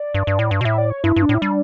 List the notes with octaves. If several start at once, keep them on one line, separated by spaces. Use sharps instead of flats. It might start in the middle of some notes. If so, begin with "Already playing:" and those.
Already playing: D5
G2
G2
A2
G2
B2
A2 E5
D5
C#5
G2 E4
G2
D4
A2
E4
G3 D4